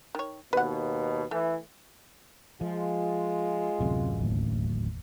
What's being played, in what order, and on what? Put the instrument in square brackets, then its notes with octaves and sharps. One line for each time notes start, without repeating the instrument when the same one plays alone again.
[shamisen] D#3 C#5
[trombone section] D#2 B2 [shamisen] B4 F#5
[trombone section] E3 [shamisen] A3
[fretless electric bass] F3 [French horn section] G#3 F4
[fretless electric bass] D1 A1 F#2 [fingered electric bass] C3
[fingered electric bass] F#1 D#2 A2